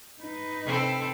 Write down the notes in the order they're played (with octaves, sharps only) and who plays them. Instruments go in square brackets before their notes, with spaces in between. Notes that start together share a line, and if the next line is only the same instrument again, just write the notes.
[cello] D#4 B4
[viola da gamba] C3 C4 A4